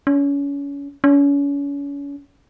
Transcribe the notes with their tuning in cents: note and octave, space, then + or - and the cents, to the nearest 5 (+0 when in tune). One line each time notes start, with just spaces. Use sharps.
C#4 +30
C#4 +35